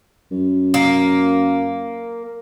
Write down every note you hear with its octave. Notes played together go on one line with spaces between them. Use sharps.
F#2
A#3